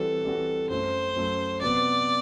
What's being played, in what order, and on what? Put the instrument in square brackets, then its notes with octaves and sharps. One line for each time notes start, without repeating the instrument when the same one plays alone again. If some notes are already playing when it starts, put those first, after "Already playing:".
Already playing: [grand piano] E3 G3 C4 F#4 [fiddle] A4
[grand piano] E3 G3 C4 F#4
[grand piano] F#2 F#3 A3 [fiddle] C5
[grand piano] F#2 F#3 A3
[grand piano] C3 F#3 B3 [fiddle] D5